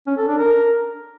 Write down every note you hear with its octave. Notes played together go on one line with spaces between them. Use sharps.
C#4
A4
D4
A#4